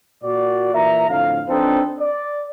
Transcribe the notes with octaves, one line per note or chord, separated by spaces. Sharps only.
A#2 F#4 D5
A#2 E3 E5 A#5
F2 A2 D3 F5
F2 C4 D4 D#4 A4 B4
D5